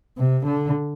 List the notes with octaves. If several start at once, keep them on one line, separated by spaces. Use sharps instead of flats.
C3
D3